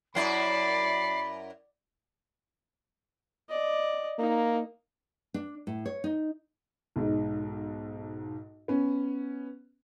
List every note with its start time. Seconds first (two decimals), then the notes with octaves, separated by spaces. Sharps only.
0.15 F#2 E4 D5 B5 C7
3.49 D5 D#5
4.19 A#3 D#4
5.34 D4
5.67 A2
5.86 C#5
6.04 D#4
6.96 B1 G#2
8.68 B3 C#4